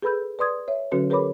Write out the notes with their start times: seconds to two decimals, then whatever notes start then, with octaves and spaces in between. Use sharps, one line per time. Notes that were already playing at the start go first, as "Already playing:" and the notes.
0.02 G#4 A4 B4 B5 E6 G6
0.39 B4 D5 C6 D#6 G#6
0.68 C#5 E5
0.92 D3 F#3 C#4 F#4 A4 B4
1.10 G#4 A#4 B4 C#5 B5 D6